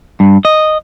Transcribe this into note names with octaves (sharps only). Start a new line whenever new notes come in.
G2
D#5